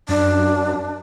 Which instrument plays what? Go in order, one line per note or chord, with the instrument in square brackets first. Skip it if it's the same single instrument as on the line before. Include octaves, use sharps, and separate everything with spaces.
[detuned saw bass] F#2 [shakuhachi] D4